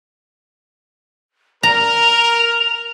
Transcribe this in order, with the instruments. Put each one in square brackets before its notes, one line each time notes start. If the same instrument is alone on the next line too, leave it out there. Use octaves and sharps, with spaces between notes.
[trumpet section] A#4 [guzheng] A#5 [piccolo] F7